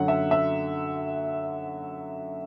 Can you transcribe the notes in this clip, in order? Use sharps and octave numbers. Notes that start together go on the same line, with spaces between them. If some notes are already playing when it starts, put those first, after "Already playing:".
Already playing: F#2 D3 F#3 F#5
E5
E5